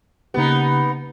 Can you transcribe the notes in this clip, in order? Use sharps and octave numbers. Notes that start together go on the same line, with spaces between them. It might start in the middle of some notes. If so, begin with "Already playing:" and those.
C#3 A#3 B3 D#4 G4